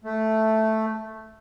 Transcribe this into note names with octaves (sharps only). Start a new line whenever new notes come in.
A3